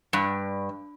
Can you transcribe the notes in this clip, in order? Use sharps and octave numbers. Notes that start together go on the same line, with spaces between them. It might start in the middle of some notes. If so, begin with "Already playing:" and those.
G2